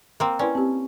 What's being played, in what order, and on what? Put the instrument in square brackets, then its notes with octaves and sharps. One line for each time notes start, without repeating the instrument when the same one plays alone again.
[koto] A#3 C4
[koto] C#4 [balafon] E4 B4 D5
[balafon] C4 G4